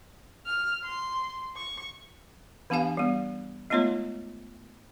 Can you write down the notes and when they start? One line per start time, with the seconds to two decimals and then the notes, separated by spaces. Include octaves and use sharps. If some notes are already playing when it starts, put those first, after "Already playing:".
0.46 F6
0.84 C6
1.56 C#6
2.70 E3 B3 D4 G4 F5 G#5
2.97 G3 B3
3.70 G#3 A3 B3 D#4 F4 C#5